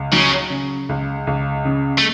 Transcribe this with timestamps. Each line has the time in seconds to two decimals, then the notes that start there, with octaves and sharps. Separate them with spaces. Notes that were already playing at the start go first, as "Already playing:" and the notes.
Already playing: C#2
0.13 C#3 F#3
0.50 C#3
0.89 C#2
1.27 C#2
1.65 C#3
1.98 A3